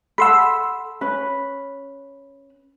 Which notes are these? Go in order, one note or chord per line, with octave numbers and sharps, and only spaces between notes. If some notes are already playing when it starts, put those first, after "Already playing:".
A4 F#5 B5 C6 E6
C#4 B4